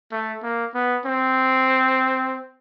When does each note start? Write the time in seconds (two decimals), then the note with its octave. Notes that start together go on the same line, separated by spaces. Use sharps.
0.12 A3
0.43 A#3
0.75 B3
1.06 C4